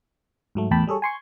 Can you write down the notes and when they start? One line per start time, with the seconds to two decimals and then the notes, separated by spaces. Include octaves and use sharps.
0.55 G#2 F#3 A3
0.71 E2 A2 G5 A5 B5
0.87 G3 G#4 A4 C#5
1.02 G#5 C6 C#6